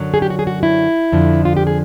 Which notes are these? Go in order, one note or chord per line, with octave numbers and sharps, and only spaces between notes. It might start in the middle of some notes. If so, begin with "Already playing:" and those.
Already playing: F#2 D3 F#3
G#4
G4
F#4
G#4
F#4
E4
F2 D3 F3
F4
G4
G#4